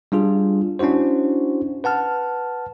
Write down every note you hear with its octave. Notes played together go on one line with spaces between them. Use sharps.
G3 D4 F4 G#4
C#4 D4 E4 F#4 C5
B4 F#5 A5 F6